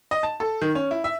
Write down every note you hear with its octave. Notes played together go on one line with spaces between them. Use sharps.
D#5
A5
A4
D#3
C#4
E4
E5